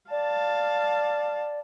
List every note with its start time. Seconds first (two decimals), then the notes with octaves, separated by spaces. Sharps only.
0.11 D5 F5 A5